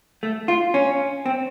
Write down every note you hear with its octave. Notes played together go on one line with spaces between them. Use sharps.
A3
F4
C#4
C4